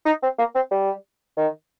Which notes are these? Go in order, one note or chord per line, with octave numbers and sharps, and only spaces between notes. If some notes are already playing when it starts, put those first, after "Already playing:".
D#4
C4
A#3
C4
G3
D#3